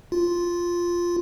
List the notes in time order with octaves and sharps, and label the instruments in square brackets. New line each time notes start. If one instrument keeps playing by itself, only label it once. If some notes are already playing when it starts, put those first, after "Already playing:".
[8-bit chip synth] F4